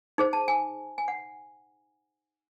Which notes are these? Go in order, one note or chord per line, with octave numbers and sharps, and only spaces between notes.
D#4 G#4 C5
A5
G#5
G#5
F#5